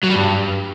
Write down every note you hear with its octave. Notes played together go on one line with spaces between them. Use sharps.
F#3
G3
G2